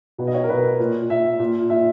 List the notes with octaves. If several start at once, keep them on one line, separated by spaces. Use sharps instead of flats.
B2 B4
D#5
C#5
A#4
B2 B4
A#2
A#2 E5
A#2
A#2 E5